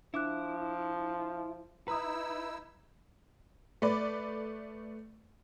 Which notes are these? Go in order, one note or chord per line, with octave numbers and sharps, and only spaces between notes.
F3 D4 E4 D6 F#6
D#4 E4 B4 A#5 D#6 E6
A3 B4 D5